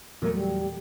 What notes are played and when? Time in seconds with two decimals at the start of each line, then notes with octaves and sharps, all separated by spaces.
0.22 E2 A#2 F#3 A3 A#4
0.34 G3